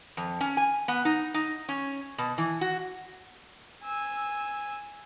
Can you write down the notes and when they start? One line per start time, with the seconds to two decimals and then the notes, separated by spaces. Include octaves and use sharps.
0.17 F2
0.41 C#4
0.57 G#5
0.88 B3
1.05 D#4
1.34 D#4
1.69 C#4
2.18 B2
2.38 E3
2.61 F#4
3.83 G#5 E6